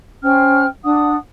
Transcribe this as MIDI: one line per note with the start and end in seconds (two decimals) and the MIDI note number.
0.23 0.65 61
0.23 0.65 72
0.23 0.65 79
0.23 0.65 89
0.84 1.15 62
0.84 1.15 74
0.84 1.15 78
0.84 1.15 87